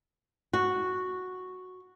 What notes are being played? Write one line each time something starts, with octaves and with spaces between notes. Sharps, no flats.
F#4